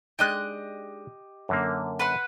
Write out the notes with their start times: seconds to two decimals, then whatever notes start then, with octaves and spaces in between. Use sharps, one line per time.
0.19 G#3 D4 D#4 G4 D#5 F#6
1.49 F#2 D3 A#3
1.99 B4 F#5 C6